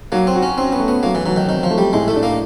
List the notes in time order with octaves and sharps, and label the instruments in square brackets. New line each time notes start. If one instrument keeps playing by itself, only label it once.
[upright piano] F#3 [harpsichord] A#3
[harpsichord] C4
[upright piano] F#4
[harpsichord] C#4
[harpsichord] C4 [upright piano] C#4
[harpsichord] B3
[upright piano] A3
[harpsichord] B3
[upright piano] F#3 [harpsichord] A#3
[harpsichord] E3
[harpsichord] E3 [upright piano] F#3
[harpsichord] D#3
[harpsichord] D#3 [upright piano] C4
[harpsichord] F3
[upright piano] A3
[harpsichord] G3
[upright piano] A2 [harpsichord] G#3
[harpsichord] A3
[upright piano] D4
[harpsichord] A#3